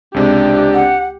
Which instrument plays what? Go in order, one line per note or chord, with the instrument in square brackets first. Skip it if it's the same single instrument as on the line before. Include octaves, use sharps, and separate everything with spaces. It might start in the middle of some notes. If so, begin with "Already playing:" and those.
[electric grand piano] C#2 C3 G#3 [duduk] D4 [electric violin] G4
[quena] F#5